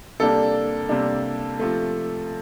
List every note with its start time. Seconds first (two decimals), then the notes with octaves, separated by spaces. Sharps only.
0.19 C3 G3 A#3 D4 A4
0.89 C3 G3 A#3 D4
1.59 C3 F3 A3